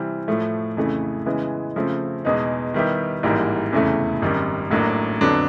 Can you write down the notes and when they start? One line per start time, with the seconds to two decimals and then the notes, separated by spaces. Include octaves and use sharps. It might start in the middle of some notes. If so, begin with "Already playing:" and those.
Already playing: C3 E3 G3 C4
0.28 A2 F3 A3
0.77 F2 C#3 E3 A3
1.26 C#3 E3 G#3 B3
1.76 C#3 F3 A3 C4
2.25 E2 B2 G#3 B3 D#4
2.74 D#3 G3 B3 E4 G4
3.23 A1 G#2 E3 G3 A#3
3.73 F1 E2 C#3 E3 A3
4.22 G#1 F#2 D#3 G3
4.71 A1 A2 F#3 A#3 D4
5.21 F2 D3 F#3 B3 D4